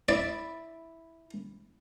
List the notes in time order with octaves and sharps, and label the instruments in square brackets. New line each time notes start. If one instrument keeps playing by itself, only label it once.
[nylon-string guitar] E4 [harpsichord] D5